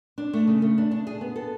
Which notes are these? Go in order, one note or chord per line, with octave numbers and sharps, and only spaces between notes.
D4
A3
C#3
A3
D4
D4
G#4
B3
A4